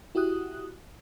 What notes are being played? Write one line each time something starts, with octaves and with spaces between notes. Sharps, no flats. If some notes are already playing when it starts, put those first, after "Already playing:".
E4 F#4 G4 D#6 F#6